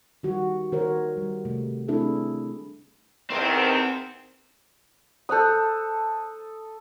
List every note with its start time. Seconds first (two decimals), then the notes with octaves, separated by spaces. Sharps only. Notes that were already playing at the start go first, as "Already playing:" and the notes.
0.23 D#3 G3 F#4
0.72 D#3 F#4 A#4 C5 C#5
1.17 G3
1.45 C3 A3
1.88 A3 C4 D4 E4 G#4 A4
3.30 E2 C3 D#3 C4 C5
5.29 A4 C5 D#6 F#6 G6